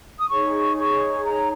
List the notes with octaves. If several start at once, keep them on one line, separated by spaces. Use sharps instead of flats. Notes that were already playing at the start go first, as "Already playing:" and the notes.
D#6
D#4 G#4 C#5 C#6
C#6
A#5